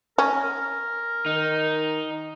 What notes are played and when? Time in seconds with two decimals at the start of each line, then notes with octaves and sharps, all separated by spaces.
0.18 C#4 A#4
1.26 D#3 D#4